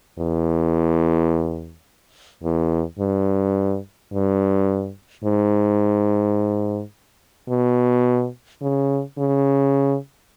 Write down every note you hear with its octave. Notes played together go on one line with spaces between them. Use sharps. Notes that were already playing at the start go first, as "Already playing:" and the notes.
E2
E2
G2
G2
G#2
B2
C#3
C#3